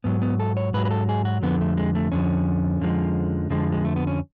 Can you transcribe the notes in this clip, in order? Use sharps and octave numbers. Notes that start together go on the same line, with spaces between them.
G#2 F#3 B3
B3
A4
C#5
G#2 F#3 B4
B4
A4
G#4
F#4
F2 D3 F3 B3
A3
G#3
A3
F2 D3 F3 C#4
F2 D3 F3 G#3
F2 D3 F3 G#3
G#3
A3
B3
C#4